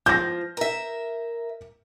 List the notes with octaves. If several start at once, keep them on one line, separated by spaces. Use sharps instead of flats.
F3 G6 A#6
A#4 E5